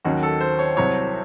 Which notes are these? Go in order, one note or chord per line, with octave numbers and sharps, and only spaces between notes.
D#2 D#3 F#3 C#4 F#4
A4
C5
C#5
C2 C3 F#3 C#5